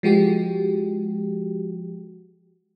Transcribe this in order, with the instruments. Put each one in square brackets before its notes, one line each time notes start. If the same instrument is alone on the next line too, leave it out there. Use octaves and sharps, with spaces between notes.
[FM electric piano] F3 G#3 F#4 G4